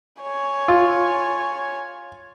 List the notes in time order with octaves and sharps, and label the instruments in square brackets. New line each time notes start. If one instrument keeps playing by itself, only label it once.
[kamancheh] C#5 G#5
[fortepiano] F4